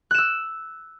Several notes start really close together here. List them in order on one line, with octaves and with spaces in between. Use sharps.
F#6 E7 E6